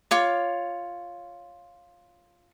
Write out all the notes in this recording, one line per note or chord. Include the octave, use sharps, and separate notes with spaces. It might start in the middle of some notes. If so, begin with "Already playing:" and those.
F4 C#5 D6